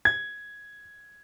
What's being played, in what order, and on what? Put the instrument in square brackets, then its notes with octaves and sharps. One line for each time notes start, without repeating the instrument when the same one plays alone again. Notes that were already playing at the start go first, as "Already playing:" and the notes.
[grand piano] G#6